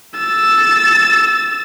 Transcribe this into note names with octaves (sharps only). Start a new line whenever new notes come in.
E6 A6